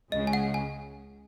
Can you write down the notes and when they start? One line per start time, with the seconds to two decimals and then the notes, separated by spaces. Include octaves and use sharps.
0.12 C#2 C#3 G#3 D#5
0.27 G#5
0.33 F#5
0.54 G#5